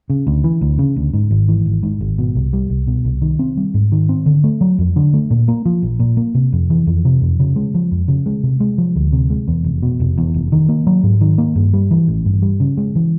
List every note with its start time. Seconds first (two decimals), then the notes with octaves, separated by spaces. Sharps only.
0.10 C#3
0.27 D2
0.44 E3
0.61 D2
0.79 C#3
0.96 D2
1.13 G#2
1.31 G#1
1.48 E3
1.66 G#1
1.83 G#2
2.01 G#1
2.18 B2
2.36 C2
2.53 G3
2.70 C2
2.87 B2
3.05 C2
3.22 D#3
3.39 C4
3.57 G3
3.74 G#2
3.92 D#3
4.09 C4
4.26 D3
4.44 A3
4.61 F#3
4.78 F2
4.96 D3
5.13 A3
5.30 A#2
5.48 A#3
5.66 F3
5.83 A#1
6.00 A#2
6.17 A#3
6.35 C3
6.53 F2
6.70 E3
6.87 F2
7.05 C3
7.22 F2
7.40 C#3
7.56 G#3
7.74 F3
7.91 F2
8.08 C#3
8.26 G#3
8.43 C3
8.60 G#3
8.78 F3
8.96 D2
9.13 C3
9.30 G#3
9.48 E2
9.64 F1
9.82 B2
10.00 F1
10.18 E2
10.34 F1
10.52 D#3
10.69 A#3
10.87 F#3
11.03 G#2
11.21 D#3
11.38 A#3
11.55 G2
11.73 G3
11.91 E3
12.08 A1
12.25 G2
12.42 G3
12.60 C#3
12.77 G#3
12.95 E3